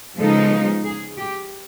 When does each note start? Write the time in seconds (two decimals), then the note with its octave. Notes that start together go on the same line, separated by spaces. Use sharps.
0.19 C#3 F3 G#3 B3 D#4 A4
0.84 G#4
1.18 G4